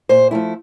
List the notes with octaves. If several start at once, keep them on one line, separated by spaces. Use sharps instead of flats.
A#2 C5
F3 A3 E4